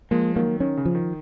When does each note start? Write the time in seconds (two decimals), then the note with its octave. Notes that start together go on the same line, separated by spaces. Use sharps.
0.11 F3 G#3 A#3
0.35 D#3 F#3 A#3
0.60 D#3 C#4
0.77 C#3
0.85 F3
0.95 D#3